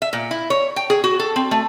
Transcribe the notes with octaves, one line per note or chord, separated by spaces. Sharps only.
E5
A#2
E4
C#5
G5
G#4
F#4
A4
C4
A3